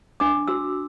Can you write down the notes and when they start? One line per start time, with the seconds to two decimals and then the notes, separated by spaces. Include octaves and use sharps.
0.20 D4 D6
0.48 F#4 E6